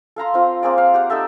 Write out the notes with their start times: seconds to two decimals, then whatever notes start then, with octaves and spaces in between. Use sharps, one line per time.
0.16 A4 F5 A#5 C6
0.34 C4 F4
0.63 A#3 C4 G#4 D5
0.78 F5
0.94 G4 F#5
1.10 D#4 G4 A4 E5